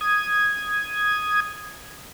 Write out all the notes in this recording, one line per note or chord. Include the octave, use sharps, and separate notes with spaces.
D#6 G#6